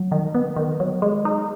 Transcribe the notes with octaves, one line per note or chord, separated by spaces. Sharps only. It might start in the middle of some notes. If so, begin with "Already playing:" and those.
Already playing: F#3
D#3
B3
D#3
F#3
G#3
D#4